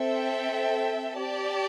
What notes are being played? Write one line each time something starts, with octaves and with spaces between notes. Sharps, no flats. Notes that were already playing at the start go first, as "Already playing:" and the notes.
Already playing: C4 A4 E5 G5
G4 D5 A5